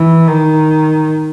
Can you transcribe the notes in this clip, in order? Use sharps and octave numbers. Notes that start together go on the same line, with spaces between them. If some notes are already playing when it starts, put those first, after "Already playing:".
Already playing: E3
D#3